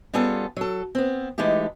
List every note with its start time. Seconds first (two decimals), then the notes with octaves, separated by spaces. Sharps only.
0.14 G3 B3 C#4 F4 G#4 A4
0.57 F#3 A4
0.95 B3 C4
1.38 E3 G#3 A3 D#4 G4